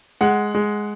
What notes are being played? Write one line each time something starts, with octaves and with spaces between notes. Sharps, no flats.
G#3 F#5
G#3